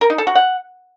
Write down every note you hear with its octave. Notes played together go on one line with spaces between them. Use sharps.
A#4
D#4
A4
F#4
F#5